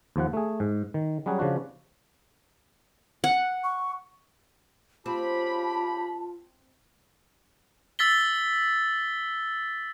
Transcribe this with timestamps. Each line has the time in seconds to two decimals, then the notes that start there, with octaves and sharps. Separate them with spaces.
0.16 D#2 F3 F#5
0.33 A3 G#4
0.60 G#2
0.94 D#3
1.26 F#3 G3 C#4 F#4 G#4
1.39 C#3 F3 D4 F#4
3.24 F#5
3.64 C#6
5.06 C#3 C4 F4 G4 A5 B5
7.99 E6 A6 B6 G7